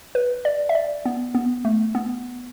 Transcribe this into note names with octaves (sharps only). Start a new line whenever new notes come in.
B4
D5
E5
D5
B3
B3
A3
B3